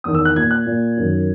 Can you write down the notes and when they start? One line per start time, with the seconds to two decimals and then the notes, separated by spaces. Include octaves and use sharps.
0.04 E2 D#3 D#6
0.15 E6
0.25 F#6
0.36 A#2 G#6
0.51 F#6
0.66 A#2
0.97 F#2 D#3